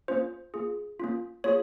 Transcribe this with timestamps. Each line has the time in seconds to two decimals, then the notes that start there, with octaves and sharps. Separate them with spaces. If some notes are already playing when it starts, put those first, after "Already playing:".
0.08 A#3 C#4 F4 C5
0.54 A#3 F4 G#4
1.00 A#3 C#4 F4
1.44 A#3 F4 G#4 C#5